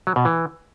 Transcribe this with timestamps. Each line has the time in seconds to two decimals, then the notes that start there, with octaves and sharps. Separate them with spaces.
0.07 F#3
0.16 B2
0.25 E3